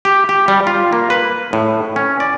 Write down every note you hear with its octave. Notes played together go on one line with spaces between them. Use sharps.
G4
G4
G3
F4
A#3
B4
A2
C#4
D5